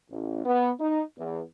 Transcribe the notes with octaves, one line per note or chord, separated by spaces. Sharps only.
A1
B3
D#4
E2